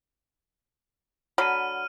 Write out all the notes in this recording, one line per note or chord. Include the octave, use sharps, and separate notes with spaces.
D3 F#3 B5 F6 D#7